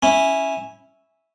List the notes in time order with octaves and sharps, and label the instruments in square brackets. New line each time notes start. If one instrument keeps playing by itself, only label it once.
[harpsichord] C#4 E4